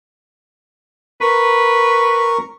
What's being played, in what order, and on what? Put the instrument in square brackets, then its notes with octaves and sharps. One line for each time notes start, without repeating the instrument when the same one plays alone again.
[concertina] A#4 C#6 [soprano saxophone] B4